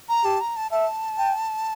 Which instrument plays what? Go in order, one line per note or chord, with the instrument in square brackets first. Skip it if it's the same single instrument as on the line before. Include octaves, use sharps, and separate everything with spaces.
[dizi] A#5
[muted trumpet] G4 [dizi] A5
[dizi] A#5
A5
[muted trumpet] E5 [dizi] A5
[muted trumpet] G5